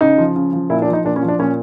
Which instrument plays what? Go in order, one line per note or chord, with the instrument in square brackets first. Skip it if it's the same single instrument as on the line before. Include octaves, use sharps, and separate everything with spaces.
[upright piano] C#3 D#4
F3
C#3
F3
A#2 E4
D4
F3 D#4
A#2 D4
C#4
F3
D4
A#2 C#4